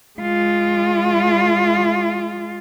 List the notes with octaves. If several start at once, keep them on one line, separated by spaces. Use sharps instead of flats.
G#3 F4